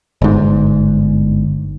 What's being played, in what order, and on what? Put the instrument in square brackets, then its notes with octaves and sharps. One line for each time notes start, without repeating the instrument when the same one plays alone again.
[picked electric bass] G1 G#2